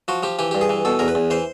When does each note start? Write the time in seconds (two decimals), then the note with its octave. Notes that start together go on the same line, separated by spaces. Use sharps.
0.08 F3 F#4
0.23 F3 G4
0.39 E3 G4
0.51 G2 G4
0.61 G#4
0.69 E3
0.85 B2 A4
0.99 E2 A#4
1.08 B4
1.15 E2
1.30 E3 C5